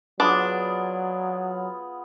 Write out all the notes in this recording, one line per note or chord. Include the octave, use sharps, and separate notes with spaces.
F#3 B3 D4 F4 G#4